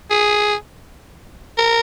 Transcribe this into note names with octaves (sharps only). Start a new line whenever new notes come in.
G#4
A#4